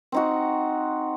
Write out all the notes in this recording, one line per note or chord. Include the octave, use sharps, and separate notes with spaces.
C4 D#4 F#4